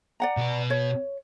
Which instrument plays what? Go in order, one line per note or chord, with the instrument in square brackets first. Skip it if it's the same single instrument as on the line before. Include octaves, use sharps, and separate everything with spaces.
[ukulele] D5 F#5 A#5
[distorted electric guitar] B2 B4
[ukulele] C#5